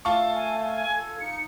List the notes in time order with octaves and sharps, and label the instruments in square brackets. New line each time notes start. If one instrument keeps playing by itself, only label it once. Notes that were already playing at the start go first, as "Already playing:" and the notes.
[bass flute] A3 [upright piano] F4 A5 C#6
[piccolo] G#5
G#5
[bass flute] A4 [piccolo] G#6
[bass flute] D#4 [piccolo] C#7